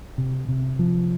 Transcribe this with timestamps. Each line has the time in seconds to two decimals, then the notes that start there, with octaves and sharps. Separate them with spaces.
0.18 C3
0.48 C3
0.79 F3